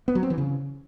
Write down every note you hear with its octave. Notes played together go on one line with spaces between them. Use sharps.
B3
F#3
C4
E3
C#3